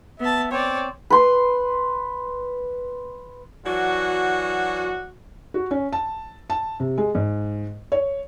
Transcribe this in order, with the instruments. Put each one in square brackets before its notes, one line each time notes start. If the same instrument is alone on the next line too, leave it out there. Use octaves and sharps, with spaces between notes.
[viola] B3 A5 [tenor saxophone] E5
[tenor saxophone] C4 [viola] C#5 D5
[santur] B4 C6
[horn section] E3 F#3 D4 F#4
[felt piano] F#4
C#4
A5
A5
C3
G#3
G#2
C#5